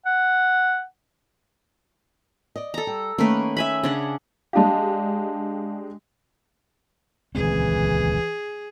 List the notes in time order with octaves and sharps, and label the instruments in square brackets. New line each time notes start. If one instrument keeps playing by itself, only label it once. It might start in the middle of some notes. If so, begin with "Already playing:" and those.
[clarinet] F#5
[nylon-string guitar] D5 D#5
[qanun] A4 A#5
[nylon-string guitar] G3
[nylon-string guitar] D#3 A3 C#4 [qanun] A#3 B4
[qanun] E5 G#5 B5
C#3 D4 F#5
[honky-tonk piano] G#3 D4 G4 [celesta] F5 A5
[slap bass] D#1 C#2 C4 [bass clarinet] E3 [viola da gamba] G#4